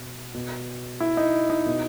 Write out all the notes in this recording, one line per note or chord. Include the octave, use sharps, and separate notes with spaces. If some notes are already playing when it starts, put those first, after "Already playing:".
Already playing: B2
B2
E4
D#4
D#4
B2